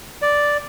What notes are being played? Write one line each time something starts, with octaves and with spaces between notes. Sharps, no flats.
D5